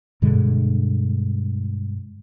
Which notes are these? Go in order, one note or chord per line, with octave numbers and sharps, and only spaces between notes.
G2 B2 D3 G#3